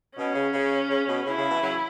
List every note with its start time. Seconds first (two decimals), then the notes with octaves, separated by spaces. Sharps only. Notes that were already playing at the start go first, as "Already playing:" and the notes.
0.17 B2 C#4
0.35 C#3
0.54 C#3
0.90 C#3
1.08 B2
1.26 C#3 E4
1.38 C#3
1.50 B2 E3
1.62 C#3 F#3